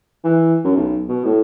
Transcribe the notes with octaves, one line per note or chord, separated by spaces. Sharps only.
E3
F#2
B1
B2
A2